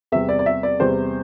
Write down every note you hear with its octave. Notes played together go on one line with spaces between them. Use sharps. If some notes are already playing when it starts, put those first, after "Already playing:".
E2 C3 G3 E5
D5
D5
E5
D5
E2 C3 G3 C5